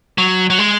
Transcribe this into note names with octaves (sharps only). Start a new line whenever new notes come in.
F#3
F#3
G#3